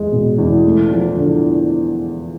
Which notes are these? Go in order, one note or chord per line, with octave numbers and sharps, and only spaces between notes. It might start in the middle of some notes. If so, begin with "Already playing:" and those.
Already playing: E2 G#3
B2
E2
A3
F3
D3